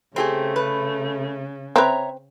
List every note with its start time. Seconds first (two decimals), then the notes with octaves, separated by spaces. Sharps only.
0.16 C#3 A3 C4 G4 G#4
0.56 B4
1.76 C4 B4 C#5 E5 A#5